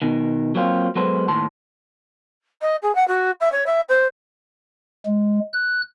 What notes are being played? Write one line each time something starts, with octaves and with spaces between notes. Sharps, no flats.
B2 D#3
F#3 A#3 C4 F4
F#3 G#3 B3 A4 C5
D#2 A2 A5 C6
D#5
G#4
F#5
F#4
E5
C#5
E5
C5
G#3
F#6